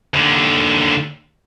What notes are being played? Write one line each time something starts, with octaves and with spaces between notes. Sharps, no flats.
D#2 D3